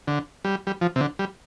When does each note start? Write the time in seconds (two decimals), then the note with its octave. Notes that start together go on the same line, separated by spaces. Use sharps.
0.08 D3
0.45 G3
0.67 G3
0.81 F3
0.96 C3
1.01 D3
1.19 G3